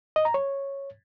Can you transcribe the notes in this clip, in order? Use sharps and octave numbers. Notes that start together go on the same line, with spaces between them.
D#5
A#5
C#5